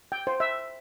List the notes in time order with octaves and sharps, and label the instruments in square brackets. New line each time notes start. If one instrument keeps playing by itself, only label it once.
[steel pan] G5
C5
E5